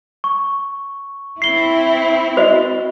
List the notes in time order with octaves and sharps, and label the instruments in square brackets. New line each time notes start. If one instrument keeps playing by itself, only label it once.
[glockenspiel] C#6
[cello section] C4 E4 [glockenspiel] C7 G7
[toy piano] F#4 C5 D#5